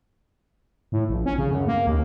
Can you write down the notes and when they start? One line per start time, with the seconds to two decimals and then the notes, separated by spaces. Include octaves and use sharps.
0.92 A2
1.09 A#1
1.26 C#4
1.38 C#3
1.51 F#2
1.67 A#3
1.87 D#2